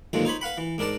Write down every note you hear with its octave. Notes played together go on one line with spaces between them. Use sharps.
D#2 G#2 D3 F3 F#3 G#3
D#4 C5 C#5 B5
B4 F5 F#5 B5
E3
G#2 D4 A#4 D5 A5